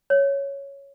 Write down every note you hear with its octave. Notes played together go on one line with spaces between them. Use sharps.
C#5